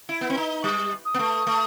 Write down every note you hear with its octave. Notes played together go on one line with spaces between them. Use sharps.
E4
B3
C4
D#4
G3 D#6
D#6
B3
A3
A3